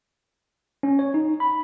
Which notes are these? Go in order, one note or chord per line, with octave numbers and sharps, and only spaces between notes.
C#4
C#5
D#4
B5